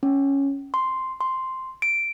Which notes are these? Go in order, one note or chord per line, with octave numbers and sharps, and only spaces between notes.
C#4
C6
C6
D7